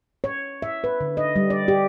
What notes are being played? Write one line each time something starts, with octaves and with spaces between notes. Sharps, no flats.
C#5
E5
B4
D3
D#5
G3
D5
G4